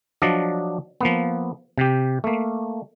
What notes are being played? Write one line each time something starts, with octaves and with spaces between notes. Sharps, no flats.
F3 F#3 D4 D5 D#5
F3 A#3 B3
C3 G4
A3 A#3